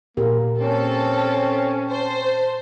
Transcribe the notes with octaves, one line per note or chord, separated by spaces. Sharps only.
A#2 A#3 G4 A#4
C4 C#4 A4
C5 A5